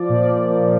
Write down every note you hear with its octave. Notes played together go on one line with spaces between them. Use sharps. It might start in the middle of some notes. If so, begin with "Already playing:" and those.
Already playing: F3 D5
A#2
A#2
F3